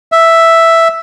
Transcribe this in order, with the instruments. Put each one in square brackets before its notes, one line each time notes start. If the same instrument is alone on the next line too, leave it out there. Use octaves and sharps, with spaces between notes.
[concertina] E5